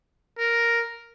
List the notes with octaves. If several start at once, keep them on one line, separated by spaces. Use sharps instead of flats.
A#4